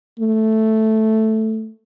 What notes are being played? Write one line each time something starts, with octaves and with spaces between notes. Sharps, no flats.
A3